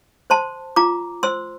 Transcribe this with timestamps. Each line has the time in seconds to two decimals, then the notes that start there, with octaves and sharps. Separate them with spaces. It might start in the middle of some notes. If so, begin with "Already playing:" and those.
0.30 C5 A5 C6
0.76 F4 A#5 D6
1.23 C5 C6 E6